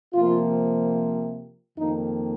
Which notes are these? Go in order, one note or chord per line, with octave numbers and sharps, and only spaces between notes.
C3 F3 A#3 F4
F2 D#3 A#3 D#4